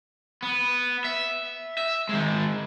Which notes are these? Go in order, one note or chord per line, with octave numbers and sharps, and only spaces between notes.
B3
E5
E5
D#3 G#3